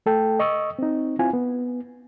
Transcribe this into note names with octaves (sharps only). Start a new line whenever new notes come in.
A3 A4 G5
D#5 C#6 D#6 E6
C4 D#4
C4 E4 F4 G#5
B3